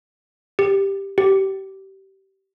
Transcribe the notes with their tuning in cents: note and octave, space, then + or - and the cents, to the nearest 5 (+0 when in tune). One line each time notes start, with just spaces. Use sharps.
G4 +5
G4 -25